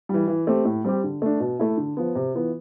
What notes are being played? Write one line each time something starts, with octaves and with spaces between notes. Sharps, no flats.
E3 G3
E3
A3 C4 G4
A2
G3 C4 G4
D3
A3 D4
B2
A3 E4
D3
F3 B3
C3
E3 B3 F4